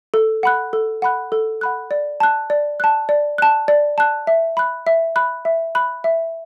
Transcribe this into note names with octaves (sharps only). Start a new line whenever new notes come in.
A4
F#5 B5 F#6
A4
F#5 B5 F#6
A4
F#5 B5 F#6
D5
A5 F#6
D5
A5 F#6
D5
A5 F#6
D5
A5 F#6
E5
B5 F#6
E5
B5 F#6
E5
B5 F#6
E5